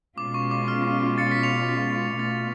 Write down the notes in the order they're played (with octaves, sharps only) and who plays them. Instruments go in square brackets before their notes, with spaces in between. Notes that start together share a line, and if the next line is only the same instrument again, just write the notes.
[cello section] B2 G#3 C#4 F4 [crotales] D6
[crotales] C#6
D6
F6
A6 C#7
B6
C#7 F7
B6
[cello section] B2 A3 F4 [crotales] A6